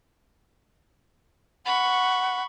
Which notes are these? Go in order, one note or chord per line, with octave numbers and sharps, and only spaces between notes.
F#5 B5 C#6